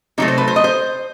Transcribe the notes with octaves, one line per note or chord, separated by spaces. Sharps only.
C3 F#3 A3 D#4
C5
B4
C5
D#5
C5